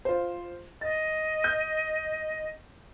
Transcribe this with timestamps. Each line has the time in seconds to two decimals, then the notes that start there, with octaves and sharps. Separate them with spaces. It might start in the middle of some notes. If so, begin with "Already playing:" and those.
0.05 F4 C5
0.81 D#5 A6
1.44 G6